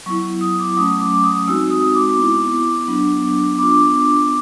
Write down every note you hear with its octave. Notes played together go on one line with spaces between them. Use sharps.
F#3 B3 E4 C#6
D#6
D6
F#3 A3 C#4 D#6
D6
D#6
G#3 C4 D#4 F#4 E6
D#6
D6
B3 E4
F#3 B3 D4
B3 D4 F4 D6